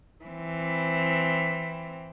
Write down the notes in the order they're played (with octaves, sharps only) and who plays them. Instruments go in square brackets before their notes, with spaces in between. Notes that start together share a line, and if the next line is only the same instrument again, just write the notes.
[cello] E3 C4